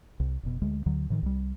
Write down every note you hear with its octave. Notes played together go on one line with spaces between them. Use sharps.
C2
F1 B2
D2 G#3
D2 D3 F#3
A2 D#3 E3
C2 G3